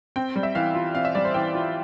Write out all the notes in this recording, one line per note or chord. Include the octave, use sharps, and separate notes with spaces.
C4 G5
G3
E5
E3 F5
F4
C4 F5
E5
G3 D5
C5
E3 G5
F4